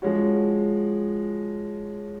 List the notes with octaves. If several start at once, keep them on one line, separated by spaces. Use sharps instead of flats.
F3 G#3 C#4 F#4